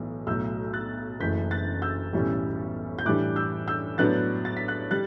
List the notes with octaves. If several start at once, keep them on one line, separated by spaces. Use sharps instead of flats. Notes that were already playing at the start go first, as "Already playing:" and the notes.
Already playing: B1 A2 E3
B1 A2 F#3 A3 E6 G6
F#6 A6
F#1 F#2 E3 A3 G6 B6
F#6 A6
E6 G6
B1 A2 E3 G3 C#4
G6
A2 E3 G3 D4 D6 F#6
E6 G6
E6 G6
A2 F#3 B3 D4 F#6 A6
A6
B6
F#6 A6
G3 F#6 A6